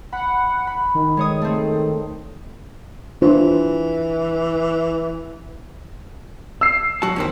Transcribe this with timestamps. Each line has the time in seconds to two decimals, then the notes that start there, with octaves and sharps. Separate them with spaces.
0.12 F#5 B5
0.67 B5
0.94 D#3
1.17 G#3 C#5 D#6
1.42 A3 C4
3.22 E3 D4 F4 C5
6.61 E6 C7
7.02 F#3 F#4 A5
7.16 F2 D#3 C4